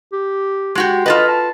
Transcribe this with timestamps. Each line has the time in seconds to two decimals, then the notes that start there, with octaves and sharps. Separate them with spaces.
0.12 G4
0.75 G#3 F#4 G4
1.06 F4 A4 B4 D#5
1.28 A5